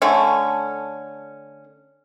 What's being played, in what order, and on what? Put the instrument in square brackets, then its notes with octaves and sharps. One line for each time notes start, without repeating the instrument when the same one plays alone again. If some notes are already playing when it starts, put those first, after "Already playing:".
[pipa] D3 A3 C#4